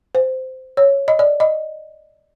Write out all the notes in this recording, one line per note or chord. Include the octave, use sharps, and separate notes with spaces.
C5
C#5
D#5
D5
D#5